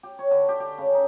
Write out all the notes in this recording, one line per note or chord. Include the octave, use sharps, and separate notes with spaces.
G4
C#5
D3
G4
G4
C#3
D#4